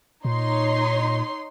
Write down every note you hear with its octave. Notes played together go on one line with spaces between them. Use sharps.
A#2 D#4 C#5 C6